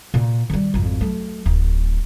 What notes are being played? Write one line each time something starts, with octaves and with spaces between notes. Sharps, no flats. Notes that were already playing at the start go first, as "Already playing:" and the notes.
A#2
D#3 G3
G#1 F2
F#3 A3
D1